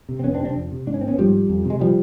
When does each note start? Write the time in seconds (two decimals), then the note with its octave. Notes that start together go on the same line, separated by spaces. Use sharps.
0.09 C3
0.19 C4
0.24 F2 B3 C#4
0.34 C4 D4
0.39 C3
0.45 C4 D4
0.56 F2
0.71 C3
0.87 G#2 D4
0.94 C#4
1.01 C4
1.08 B3 C#4
1.18 G#2 F3 G3
1.49 F2
1.65 C3
1.70 G#3
1.80 F3 G3